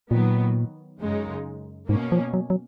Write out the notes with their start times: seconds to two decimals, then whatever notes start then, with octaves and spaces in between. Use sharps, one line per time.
0.11 A#2 D#3 F#3 B3
1.00 F#2 C#3 G#3 D#4
1.89 G#2 B2 A#3 C#4
2.12 F3
2.34 F#3
2.50 F#3